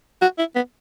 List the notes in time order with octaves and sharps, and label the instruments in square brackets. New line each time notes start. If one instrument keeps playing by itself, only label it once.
[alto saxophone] F#4
E4
B3